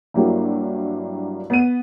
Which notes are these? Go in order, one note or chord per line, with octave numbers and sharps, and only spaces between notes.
G2 F#3 A#3 E4 G4
B3 D#7